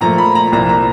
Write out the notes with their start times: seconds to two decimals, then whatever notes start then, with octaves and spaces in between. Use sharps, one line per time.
0.01 A#2 F3 A3 A#5
0.18 B5
0.35 A#5
0.52 C2 A#2 F3 A#5
0.69 A#5